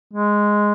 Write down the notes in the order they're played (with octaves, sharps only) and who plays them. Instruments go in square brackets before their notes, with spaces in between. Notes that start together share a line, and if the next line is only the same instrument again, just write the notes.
[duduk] G#3